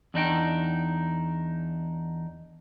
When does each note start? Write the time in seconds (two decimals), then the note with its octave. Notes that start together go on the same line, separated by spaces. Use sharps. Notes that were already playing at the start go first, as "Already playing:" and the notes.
0.14 E2 D4 D#4 G5